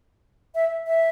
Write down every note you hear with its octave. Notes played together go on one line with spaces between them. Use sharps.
E5
E5